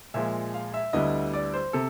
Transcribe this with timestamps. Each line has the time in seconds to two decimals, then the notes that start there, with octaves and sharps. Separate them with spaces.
0.14 A#2 F3 G#3 E5
0.54 F5
0.74 E5
0.93 D2 D3 G3 B3 E4 D#5
1.34 D5
1.54 C5
1.73 C3 A4